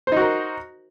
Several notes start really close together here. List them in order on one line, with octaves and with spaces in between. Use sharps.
C5 D#4 F#4 A#4